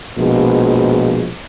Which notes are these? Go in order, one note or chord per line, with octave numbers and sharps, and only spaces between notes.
A#1 B2 F3 G#3